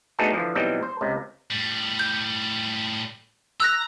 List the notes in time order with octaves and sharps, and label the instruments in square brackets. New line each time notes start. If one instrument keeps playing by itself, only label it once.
[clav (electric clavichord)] A3 B3 D4 D#4 F#4 G#4
D3 E3 F3
B2 E3 F#3 G3 C4 D#4
C5
C#2 C3
[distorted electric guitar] A2 G3
[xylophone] G6
[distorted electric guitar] A#5 [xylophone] E6 F#6 A#6